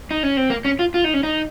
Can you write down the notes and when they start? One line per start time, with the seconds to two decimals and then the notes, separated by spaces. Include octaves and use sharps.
0.11 D#4
0.23 C#4
0.37 C4
0.50 A#3
0.65 C#4
0.79 F4
0.94 F4
1.04 D#4
1.14 C#4
1.23 D#4